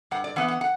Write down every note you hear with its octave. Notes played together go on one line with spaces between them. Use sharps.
G2 F#5
D5
E3 B3 F#5
F#5
F#5